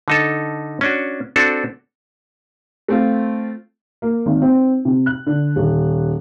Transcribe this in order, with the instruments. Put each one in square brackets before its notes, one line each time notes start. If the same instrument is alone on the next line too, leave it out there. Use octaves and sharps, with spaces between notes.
[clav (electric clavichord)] D3 D#4 A4
C#4 D4 F#4
C4 D4 F#4 A4
[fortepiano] A3 C4 F4
[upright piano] A#3
G#1
C4
C3
F#6
D3
D#1